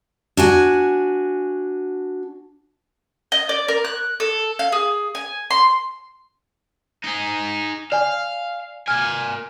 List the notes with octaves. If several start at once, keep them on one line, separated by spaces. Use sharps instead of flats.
D4 F#4 G#5
D#5
D5
A#4
F#6
A4
F5
G#4
G#5
C6
D#4 G#4
D5 F5 G#5
A#3 G#5 F6 G#6